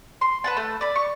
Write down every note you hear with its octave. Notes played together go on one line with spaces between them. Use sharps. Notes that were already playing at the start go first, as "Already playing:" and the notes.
C6
B4 F#5 A5
A3
D5 B5
C#6